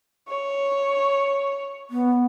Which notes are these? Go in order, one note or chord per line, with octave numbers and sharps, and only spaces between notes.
C#5
B3